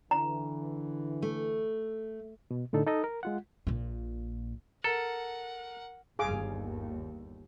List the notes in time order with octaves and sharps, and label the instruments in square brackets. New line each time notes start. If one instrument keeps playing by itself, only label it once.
[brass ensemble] D3 E3 [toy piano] A#5
[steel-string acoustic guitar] A3
[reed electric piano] B2
A2 D3 D#4 A4
D#4 A4 D#5
A#4
G#3 F4 F#5
[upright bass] A#1 A#2
[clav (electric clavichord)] A4 [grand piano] A#4 [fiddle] F#5
[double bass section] G1 D#2 [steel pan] G#4 F5 D6